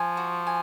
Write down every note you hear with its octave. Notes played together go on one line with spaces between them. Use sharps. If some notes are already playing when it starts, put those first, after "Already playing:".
Already playing: F3 G#5
F#4
G#5